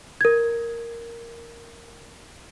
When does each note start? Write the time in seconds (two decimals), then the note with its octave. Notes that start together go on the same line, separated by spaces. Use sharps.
0.21 A#4 G#6